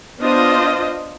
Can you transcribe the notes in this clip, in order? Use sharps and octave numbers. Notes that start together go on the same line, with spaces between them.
B3 D4 F4 C5 D#5